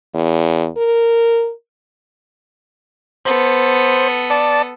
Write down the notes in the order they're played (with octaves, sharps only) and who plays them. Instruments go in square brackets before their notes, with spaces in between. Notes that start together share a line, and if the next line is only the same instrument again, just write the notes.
[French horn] E2
A#4
[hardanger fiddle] B3 A4 [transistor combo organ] C5
[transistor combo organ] D5 A5